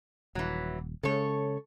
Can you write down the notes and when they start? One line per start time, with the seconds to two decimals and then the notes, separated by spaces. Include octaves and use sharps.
0.35 D#1 E3 F#3
1.03 C#3 G#3 A4 C#5